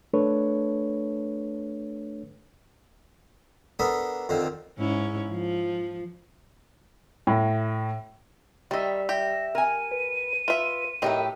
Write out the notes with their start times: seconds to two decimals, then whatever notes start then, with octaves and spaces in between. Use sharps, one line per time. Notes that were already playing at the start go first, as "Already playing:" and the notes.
0.13 A3 D4 A4 B4 C#5
3.79 B3 D4 A4 A#4 B5 D#6
4.29 F2 D3 D#3 F3 C4
4.78 G#2 C#4 E4
5.30 F3
7.27 A2
8.71 D#3 G3 D#5 E5
9.09 G4 E5 A#6
9.55 A#4 G#5 D#7
9.91 B4
10.48 F4 B4 E5
11.02 A2 E3 F#3 D#4 G4 A#4 D#5 E5